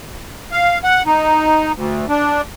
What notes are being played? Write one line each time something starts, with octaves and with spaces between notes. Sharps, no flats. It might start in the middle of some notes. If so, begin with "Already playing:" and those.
F5
F#5
D#4
D2
D4